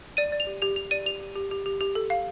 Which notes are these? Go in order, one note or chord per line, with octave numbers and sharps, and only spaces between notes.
D5 D#7
D5
F7
G4
G4 F7
G4 F7
D5 D#7
G4 F7
G4
G4
G4
G4
G4
A4
F5